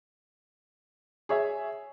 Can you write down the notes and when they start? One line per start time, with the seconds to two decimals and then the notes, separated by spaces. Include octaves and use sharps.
1.29 G#4 C#5 E5